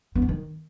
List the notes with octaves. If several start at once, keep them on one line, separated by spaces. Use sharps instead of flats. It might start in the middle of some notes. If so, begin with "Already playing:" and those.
B3
E3
D#3